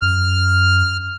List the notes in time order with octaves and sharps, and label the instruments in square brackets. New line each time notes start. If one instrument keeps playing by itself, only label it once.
[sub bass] F#2 [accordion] F6